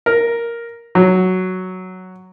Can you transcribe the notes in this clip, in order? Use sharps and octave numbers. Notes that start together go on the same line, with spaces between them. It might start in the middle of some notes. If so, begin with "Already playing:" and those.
A#4
F#3